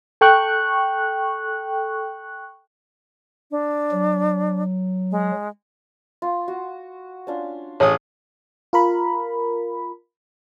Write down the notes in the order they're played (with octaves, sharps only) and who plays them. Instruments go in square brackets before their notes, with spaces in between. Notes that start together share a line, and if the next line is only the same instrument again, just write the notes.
[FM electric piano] A4 G5 C#6 F#6
[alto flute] D4
[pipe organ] F#3
[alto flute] G#3
[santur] F4
F#4
C#4 D4 F4
[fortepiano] A1 G#4 D#6 [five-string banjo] C#5
[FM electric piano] F4 A#4 B5